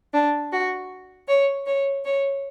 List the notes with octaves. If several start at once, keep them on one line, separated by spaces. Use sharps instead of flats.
D4
F#4
C#5
C#5
C#5